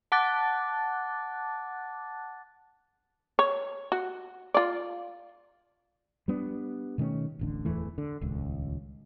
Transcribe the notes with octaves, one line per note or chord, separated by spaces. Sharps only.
F#5 A5 D6 F#6 A6
C#5
F#4
F4 D5
G3 B3 D4
B2 D#3 A3 C#4
D1 A1 D3
D1 E2 E3 A3
D3
D#1 C#2